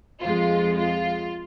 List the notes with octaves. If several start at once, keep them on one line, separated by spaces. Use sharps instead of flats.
F2 F3 G#3 F4
F4